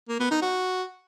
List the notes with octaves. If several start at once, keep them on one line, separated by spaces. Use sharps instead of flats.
A#3
B3
D#4
F#4